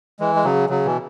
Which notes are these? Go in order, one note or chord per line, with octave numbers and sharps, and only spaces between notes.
E3 G#3
G#3
C#3 F#3
C#3 F#3
B2 E3